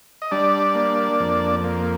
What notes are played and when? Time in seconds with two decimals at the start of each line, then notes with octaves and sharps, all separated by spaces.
0.22 D#5
0.32 G3 D4 D5
0.75 A#3
1.20 F2
1.64 A#3